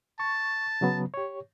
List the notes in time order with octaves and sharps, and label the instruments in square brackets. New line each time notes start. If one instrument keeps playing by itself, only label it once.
[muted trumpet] A5 [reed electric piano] C#6
[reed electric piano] C#3 F#3 B3
G4 C#5